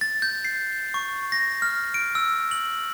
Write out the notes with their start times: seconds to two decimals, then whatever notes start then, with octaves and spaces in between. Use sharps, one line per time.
0.01 A6
0.22 G6
0.45 C7
0.94 C#6
1.32 A#6
1.62 F6
1.94 D7
2.15 E6
2.51 F#7